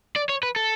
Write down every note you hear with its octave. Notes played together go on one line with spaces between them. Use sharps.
D5
C#5
B4
A4